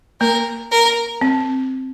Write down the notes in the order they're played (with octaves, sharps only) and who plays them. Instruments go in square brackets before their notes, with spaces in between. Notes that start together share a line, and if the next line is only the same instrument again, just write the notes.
[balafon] A#3 [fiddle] A#4
[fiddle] A#4
[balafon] C4